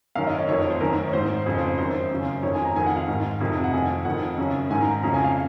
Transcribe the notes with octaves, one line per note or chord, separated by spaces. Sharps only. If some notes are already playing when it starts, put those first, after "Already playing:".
F#2 D#3 F5
D#5
C#5
F2 D#3 C#5
C#5
C5
F#2 D#3 A#4
C#5
G#2 D#3 C5
F2 C#3
C5
C5
F#2 D#3 C5
F#2 C#3
F2 D#3 C#5
G#5
A#5
F2 D#3 G#5
F#5
F5
G#2 D#3
F2 C3 D#3
F#5
F2 D#3 G#5
F2 D#3 F#5
F#2 C#3
G#2 D#3 G#5
A#5
F2 C#3 A#5
G#5
F5